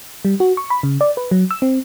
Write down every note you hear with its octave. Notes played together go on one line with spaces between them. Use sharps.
G3
F#4
C#6
B5
C#3
D5
B4
F#3
E6
C4